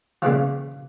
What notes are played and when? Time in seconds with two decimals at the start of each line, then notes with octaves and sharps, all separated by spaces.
0.22 A#2 C#3 E3 F3